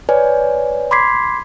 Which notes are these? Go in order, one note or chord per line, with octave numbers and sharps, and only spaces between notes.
B4 C#5 D5 G#5
B5 C6 D6 G#6 B6 C7